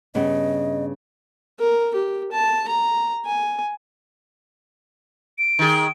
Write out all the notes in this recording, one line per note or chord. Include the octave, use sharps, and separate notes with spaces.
G2 C#3 B3 D#5
A#4
G4
A5
A#5
G#5
D7
D#3 G#4